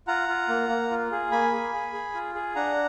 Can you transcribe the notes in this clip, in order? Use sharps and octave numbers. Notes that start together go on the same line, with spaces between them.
F4 F#5 A#5
F4
A#3
A#3
F4
G#4
A#3 G#5 B5
G#4
G#4
G#4
F4
G#4
D4 F#5 A#5